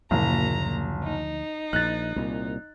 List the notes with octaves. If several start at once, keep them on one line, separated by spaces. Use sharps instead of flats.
F#1 D2 A#2 F3 F#3 A#5
D#4
A#1 F#6 A6
C2 A#2